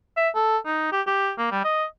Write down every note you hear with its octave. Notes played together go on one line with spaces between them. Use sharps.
E5
A4
D#4
G4
G4
A#3
G3
D#5